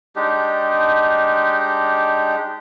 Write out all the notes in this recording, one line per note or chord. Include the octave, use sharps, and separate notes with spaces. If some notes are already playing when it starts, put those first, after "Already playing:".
G#3 D4 D#4 G4